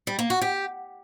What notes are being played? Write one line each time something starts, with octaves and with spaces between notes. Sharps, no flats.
G3
A#3
F#4
G4